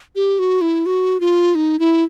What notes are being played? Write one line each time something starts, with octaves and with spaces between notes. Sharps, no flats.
G4
F#4
E4
F#4
F4
D#4
E4